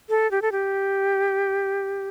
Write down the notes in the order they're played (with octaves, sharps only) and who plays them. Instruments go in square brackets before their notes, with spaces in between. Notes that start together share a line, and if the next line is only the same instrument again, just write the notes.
[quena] A4
G4
A4
G4